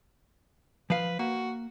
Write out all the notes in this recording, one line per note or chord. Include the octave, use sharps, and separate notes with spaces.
F3 B4 F5
A#3 F#4